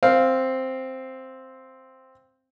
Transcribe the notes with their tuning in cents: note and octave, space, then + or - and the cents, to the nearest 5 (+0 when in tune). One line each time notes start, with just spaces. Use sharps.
C4 +0 F5 +0